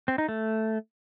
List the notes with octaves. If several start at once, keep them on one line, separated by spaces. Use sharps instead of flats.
C4
D#4
A3